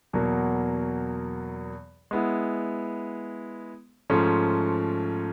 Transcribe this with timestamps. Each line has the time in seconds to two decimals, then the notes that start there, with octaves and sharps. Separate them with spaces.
0.13 E2 B2 F#3 A#3
2.11 G#3 B3 E4
4.10 G#2 F3 A3 C#4